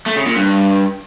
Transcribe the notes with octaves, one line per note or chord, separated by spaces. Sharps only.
A3
C#3
A#2
G2